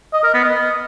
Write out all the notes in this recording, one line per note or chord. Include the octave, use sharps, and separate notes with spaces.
D#5
A#4
B3
D#5